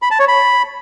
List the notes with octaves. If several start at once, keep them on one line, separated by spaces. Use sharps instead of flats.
B5
A5
C#5
B5